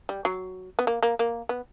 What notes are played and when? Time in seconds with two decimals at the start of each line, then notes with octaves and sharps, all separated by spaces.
0.09 G3
0.25 F#3
0.79 B3
0.87 A#3
1.03 A#3
1.19 A#3
1.49 B3